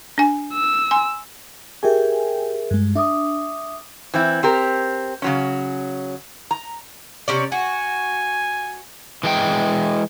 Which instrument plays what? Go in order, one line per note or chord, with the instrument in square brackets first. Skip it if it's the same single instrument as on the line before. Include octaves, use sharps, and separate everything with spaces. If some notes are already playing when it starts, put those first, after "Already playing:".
[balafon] D4 G#5
[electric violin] E6
[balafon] G#5 C6
[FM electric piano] G4 G5 G#5 [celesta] G#4 A#4 E5
[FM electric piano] G2 G#3
[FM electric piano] D4 [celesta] E5 D6 D#6
[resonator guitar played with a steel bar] E3 C4 E4
C4 G4 A#4
C#3 F#3 C#4
A#5
[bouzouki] C3 C#4 D5
[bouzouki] F#4 [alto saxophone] G#5
[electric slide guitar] E3 G#3 G5